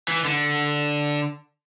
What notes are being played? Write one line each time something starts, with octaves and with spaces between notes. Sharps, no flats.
E3
D3